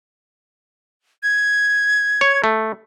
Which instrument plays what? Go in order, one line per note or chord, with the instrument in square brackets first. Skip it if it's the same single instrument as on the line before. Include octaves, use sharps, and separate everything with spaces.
[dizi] G#6
[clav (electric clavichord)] C#5
A3